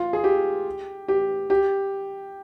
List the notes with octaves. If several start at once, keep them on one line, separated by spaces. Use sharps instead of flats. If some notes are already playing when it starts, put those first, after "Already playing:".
Already playing: F4
G#4
G4
G4
G4